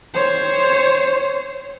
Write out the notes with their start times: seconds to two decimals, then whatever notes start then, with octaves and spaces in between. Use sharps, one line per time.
0.14 C5 C#5